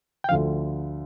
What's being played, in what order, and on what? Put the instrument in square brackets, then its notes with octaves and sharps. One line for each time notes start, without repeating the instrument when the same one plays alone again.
[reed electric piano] G5
[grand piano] D2 D3 F3 [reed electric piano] F5